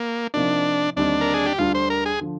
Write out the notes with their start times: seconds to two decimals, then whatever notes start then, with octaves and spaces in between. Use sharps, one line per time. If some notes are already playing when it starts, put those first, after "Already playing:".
Already playing: A#3
0.34 C3 F3 A#3 D4 D#4
0.96 D#2 D3 G3 C4 D4 D#4
1.21 A#4
1.34 G#4
1.46 G4
1.58 D2 D3 G3 D4 F4
1.75 C5
1.90 A#4
2.06 G#4
2.21 D3 F3